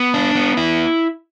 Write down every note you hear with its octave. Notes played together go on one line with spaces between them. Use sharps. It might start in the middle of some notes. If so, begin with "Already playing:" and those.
Already playing: B3
D4
B3
E4